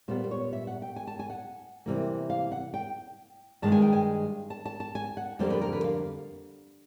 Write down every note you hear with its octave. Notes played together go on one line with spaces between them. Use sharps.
A#2 G3 B3 C5
C5
C#5
E5
F#5
G5
G#5
A5
G#5
F#5
C3 E3 G3 A#3
F5
F#5
G5
G2 D#3 G#3 A5
G#5
G5
G#5
A5
A5
A5
G#5
F#5
F2 D3 G3 A#3 C5
B4
A#4
B4
F5